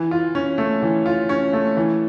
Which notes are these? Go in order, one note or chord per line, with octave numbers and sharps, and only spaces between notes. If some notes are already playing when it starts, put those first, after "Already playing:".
Already playing: E3
F4
C#4
A3
E3
F4
C#4
A3
E3